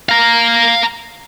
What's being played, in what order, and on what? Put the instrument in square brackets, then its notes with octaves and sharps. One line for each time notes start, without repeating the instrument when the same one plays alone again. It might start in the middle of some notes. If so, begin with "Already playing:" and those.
[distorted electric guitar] F5 A#5